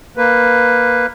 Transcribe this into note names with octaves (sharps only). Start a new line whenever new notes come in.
A#3 B4